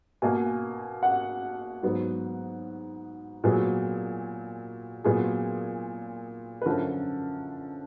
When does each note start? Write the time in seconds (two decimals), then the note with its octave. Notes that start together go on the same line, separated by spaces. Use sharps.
0.22 B2 A#3 G#5
1.03 F#5
1.83 G#2 F#3 B3
3.44 A#2 F#3 B3 G#4
5.04 A#2 F#3 B3 G#4
6.62 B4
6.66 F#2 D3 F3 A#4